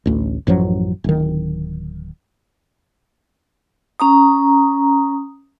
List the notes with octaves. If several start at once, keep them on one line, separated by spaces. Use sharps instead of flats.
A1 D2
A1 F#2 F3 F#3
D1 D#3
C#4 A#5 D#6